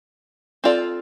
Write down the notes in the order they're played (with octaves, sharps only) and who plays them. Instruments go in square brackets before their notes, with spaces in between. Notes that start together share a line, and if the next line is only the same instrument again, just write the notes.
[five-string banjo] C4 F4 A4 D5